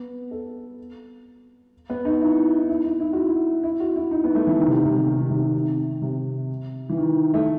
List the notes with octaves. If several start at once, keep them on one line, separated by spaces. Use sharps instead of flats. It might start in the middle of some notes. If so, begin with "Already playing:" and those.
Already playing: B3
A4
B3
D#4
E4
D#4
E4
D#4
E4
F#4
E4
E4
F#4
E4
D#4
B3
A3
E3
D#3
C3
C3
C3
D#3
D#3
C3
D#3
C3
E3
D#3
A3